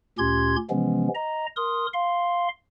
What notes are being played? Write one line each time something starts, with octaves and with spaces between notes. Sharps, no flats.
D2 A#2 C#4 G4 C6 G#6
C3 E3 F3 G#3 B3 C#4
D#5 A#5
A#4 C6 D#6
F5 C6